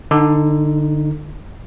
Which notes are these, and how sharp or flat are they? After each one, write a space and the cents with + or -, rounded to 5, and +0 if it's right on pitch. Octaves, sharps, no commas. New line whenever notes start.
D3 +25 D#4 +0